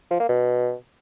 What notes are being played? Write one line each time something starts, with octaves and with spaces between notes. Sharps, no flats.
F3
A#3
B2